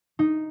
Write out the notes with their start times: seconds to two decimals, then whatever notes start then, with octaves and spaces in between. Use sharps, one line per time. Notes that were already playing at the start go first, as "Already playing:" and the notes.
0.19 D#4